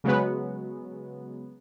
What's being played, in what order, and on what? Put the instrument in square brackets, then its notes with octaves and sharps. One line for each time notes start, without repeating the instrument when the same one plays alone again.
[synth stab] C#3 F#3 G#3 B3